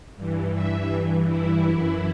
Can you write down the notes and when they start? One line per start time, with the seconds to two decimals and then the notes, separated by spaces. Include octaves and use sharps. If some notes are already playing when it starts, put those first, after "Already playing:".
0.16 G2 E3
0.53 E5
0.90 G2 E3
1.27 E4
1.64 F#2
1.69 E3